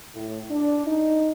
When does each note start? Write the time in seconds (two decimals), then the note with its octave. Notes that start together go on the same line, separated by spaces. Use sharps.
0.15 A2
0.50 D4
0.87 D#4